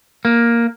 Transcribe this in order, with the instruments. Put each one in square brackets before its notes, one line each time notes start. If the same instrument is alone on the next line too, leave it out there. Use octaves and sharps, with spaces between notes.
[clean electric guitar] A#3